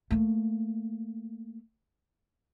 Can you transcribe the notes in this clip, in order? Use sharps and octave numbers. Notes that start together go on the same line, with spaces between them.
A3 A#3